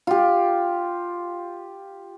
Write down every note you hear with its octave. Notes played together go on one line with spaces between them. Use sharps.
F4 G4